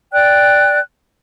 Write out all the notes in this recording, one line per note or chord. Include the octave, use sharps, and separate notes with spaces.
D5 G5 F#6